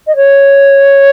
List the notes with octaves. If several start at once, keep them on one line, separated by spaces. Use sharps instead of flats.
D#5
C#5